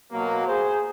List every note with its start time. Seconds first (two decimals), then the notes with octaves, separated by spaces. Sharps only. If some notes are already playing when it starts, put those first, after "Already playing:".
0.11 B2 F#3 A#3
0.47 G#4 C5